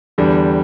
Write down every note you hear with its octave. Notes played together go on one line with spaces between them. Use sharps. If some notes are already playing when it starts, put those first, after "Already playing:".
E2 D3 G3